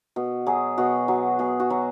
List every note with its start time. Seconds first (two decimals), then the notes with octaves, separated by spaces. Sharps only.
0.16 B2
0.46 F#3 G#4
0.78 B2 F#4
1.08 F#3
1.39 B2 G#4
1.60 F#4
1.70 F#3